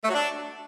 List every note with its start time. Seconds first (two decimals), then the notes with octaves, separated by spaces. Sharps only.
0.03 A3
0.09 F#3
0.14 D4